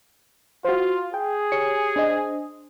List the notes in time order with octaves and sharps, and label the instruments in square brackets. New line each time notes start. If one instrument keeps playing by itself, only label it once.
[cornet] F4 [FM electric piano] F#4 C5
[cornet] G#4 [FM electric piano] G5
[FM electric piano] G4 C#5 C#7
D4 C5 D#5